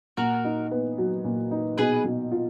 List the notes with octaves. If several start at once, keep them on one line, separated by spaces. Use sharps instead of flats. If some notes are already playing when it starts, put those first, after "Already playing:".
A#2 F#4 A#4
D#4
B3
F#3
A#2
D#4
B2 G#4 B4
B2
F4